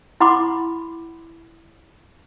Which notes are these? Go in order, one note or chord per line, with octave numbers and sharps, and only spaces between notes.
E4 F#5 B5 C6 D6